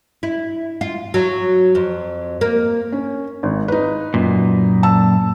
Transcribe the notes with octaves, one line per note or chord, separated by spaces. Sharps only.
E4
F4
F#3
F2
A#3
C#4
G#1
D#4 B4
F#2 A#2
A5 E6